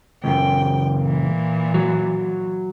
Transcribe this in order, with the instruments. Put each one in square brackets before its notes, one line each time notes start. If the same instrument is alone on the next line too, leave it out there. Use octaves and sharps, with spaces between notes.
[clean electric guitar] C#2 F#2 [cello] G5
[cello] A#2 E3
[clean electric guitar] F#3